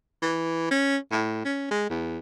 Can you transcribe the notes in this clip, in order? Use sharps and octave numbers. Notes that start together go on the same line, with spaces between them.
E3
C#4
A2
C#4
G#3
E2